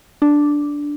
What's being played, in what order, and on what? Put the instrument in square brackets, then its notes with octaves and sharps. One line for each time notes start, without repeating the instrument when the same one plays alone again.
[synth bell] D4